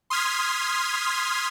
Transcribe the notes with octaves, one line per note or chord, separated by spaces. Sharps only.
C6 D#6 F6 G#6 B6